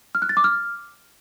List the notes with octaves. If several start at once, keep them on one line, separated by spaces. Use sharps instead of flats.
F6
F#6
A6
D6
F6